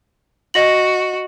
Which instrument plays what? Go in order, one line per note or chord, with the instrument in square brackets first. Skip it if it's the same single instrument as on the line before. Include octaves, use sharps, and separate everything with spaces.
[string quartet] F#4 [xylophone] D#5 A#6 F#7